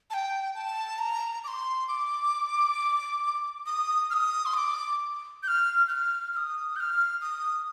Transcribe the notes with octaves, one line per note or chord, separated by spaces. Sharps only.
A5
G5
A5
A#5
D6
C6
D6
D#6
F6
D#6
C6
D#6
D6
G6
F6
G6
F6
F6
D#6
G6
F6
D#6